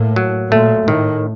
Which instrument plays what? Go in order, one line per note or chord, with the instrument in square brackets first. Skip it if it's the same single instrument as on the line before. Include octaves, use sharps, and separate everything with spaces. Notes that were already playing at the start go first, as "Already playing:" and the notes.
Already playing: [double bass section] A2 [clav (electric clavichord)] A#3
[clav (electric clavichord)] F#3
[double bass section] A#2 [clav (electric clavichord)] A3
[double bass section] A2 [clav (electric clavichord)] D#3